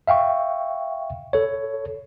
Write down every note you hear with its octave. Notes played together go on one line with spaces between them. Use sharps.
E5 F5 G5 C#6
A4 C#5